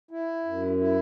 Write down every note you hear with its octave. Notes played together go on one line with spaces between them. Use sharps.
E4
F#2
E4